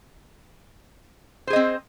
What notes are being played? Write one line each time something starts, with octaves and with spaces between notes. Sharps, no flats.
C4 G#4 C5 D#5